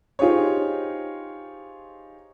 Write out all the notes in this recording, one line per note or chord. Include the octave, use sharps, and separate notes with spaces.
D#4 F4 G4 G#4 C5 C#5